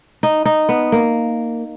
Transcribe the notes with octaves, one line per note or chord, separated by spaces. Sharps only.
D#4
D#4
B3
A#3